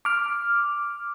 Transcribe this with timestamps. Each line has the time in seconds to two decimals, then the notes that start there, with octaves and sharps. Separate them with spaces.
0.05 D6 F6